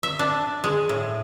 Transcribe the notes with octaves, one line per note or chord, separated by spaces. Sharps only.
E5
D4
G#3
A2